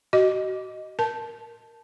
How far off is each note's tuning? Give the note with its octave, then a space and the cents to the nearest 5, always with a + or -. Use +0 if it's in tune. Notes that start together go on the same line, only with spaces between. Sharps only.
F#4 +35 D#5 +0
A#4 +0 A5 +0